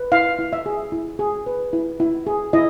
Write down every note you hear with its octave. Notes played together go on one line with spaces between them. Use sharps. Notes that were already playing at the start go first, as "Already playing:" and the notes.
Already playing: B4
E4 F5
E4
E5
G#4
E4
G#4
B4
E4
E4
G#4
E4 D#5